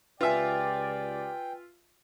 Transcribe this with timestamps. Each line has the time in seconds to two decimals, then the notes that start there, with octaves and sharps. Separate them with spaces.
0.21 C#2 F4 G4 B4 D5 E5 G5 G#5